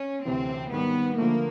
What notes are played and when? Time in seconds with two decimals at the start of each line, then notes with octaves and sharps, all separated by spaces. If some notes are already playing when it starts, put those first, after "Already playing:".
Already playing: C#4
0.25 D2 C3 E3 C4
0.72 G#2 D#3 G3 B3
1.18 D3 F3 A3 A#3